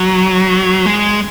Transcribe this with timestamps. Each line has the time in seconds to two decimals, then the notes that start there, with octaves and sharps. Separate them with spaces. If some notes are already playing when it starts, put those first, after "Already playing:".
Already playing: F#3
0.86 G#3